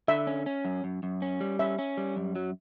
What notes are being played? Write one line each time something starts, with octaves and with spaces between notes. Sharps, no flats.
D3 E5
C#4
C#4
F#2
F#2
F#2
C#4
G3
C#4 E5
C#4
G3
F#2
F#3